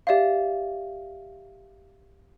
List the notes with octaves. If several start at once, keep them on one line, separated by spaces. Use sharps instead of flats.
G4 D5 E5 F5